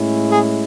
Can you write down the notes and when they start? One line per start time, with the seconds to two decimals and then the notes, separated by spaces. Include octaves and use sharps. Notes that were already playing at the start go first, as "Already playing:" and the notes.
Already playing: A2 G#3 C#4 E4
0.32 G#4